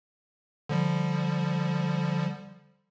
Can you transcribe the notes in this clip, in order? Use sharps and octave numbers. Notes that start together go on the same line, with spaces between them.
D3 F3 G3